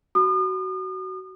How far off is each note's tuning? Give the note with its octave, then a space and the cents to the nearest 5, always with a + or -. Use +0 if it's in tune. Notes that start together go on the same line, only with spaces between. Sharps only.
F#4 +20 D#6 -40